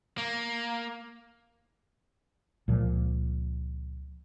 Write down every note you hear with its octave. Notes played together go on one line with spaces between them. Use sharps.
A#3
C#2 A#2 F3